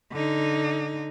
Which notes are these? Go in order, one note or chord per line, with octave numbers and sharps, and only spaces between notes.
D3 D#4